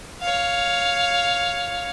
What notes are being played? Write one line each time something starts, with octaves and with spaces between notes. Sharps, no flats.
C#5 F5